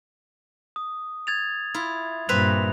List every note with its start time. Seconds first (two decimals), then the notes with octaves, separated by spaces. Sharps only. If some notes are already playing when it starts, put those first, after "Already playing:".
0.76 D#6
1.27 G#6 A6 F7
1.74 E4 F4
2.29 G2 A#2 C4 B4 E5 F7